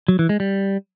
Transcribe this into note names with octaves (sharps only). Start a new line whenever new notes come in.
F#3
E3
G#3
G3